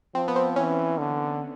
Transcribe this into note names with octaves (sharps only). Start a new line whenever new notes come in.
F3 C4
B3
C4
E3 C#4
D3